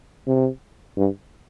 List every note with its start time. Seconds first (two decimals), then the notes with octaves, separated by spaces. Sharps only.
0.27 C3
0.97 G2